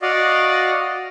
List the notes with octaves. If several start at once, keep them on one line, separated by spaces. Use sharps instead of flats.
F#4 D5 D#5 F5